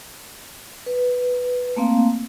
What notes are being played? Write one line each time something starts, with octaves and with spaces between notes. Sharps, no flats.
B4
A3 A#3 C4 F5